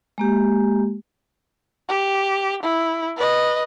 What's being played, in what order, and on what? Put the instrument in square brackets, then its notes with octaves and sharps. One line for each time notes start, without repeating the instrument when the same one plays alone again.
[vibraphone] G#3 A#3 G4
[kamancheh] G4
E4
B4 D#5